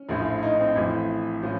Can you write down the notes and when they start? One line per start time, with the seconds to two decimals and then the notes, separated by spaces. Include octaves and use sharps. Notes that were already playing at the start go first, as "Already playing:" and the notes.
Already playing: C#4
0.09 A#1 A2 F3
0.43 D#4
0.60 C4
0.76 A1 A2 F3
1.43 A2 F3 C#4